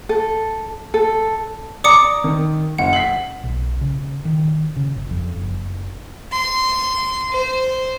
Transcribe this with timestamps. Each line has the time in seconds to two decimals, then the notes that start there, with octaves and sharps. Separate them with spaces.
0.09 A4
0.94 A4
1.84 D5 A#5 D6 D#6 C#7
2.24 D#3
2.78 F#1 F#5
2.93 B6 C7 F#7
3.44 B1
3.81 C#3
4.25 D#3
4.76 C#3
4.96 G1
5.11 F2
5.36 F#1
6.32 C6
7.31 C5